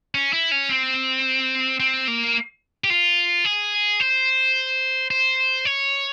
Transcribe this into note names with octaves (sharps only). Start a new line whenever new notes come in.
C#4
E4
C#4
C4
C4
A#3
G4
F4
G#4
C5
C5
C#5